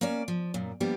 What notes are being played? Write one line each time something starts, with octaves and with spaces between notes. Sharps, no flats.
A#3 C#4 C#5 D5
F3
F#2 A#2
F3 G3 A#3 B3 D4 G4